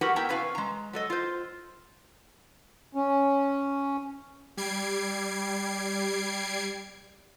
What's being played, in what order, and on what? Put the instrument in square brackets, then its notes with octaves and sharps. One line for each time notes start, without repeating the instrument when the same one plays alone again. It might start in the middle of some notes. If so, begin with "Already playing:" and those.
[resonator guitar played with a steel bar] E4 F#4 G4 A#4 B4 F#5
B3 E4 A#4 G5 A5 A#5
C3 C#4 B4 F5
G#3 A#5
F#3 A4 D#5
F4 C5
[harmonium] C#4
[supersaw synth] G3 G#6 C7 D7